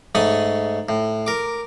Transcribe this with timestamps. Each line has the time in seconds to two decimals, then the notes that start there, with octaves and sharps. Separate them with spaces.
0.15 G#2 A3 C#5 B5 D#6
0.89 A2
1.27 A#4 D6